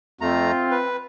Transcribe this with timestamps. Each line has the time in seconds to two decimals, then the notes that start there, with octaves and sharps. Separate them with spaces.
0.21 F2 A3 C4 F4 A#5
0.71 B4